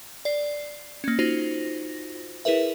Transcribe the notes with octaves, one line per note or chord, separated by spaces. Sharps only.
D5 C7
A#3 C#4
D#4 F4 F#4 C5 A#6
E4 G#4 A#4 B4 E5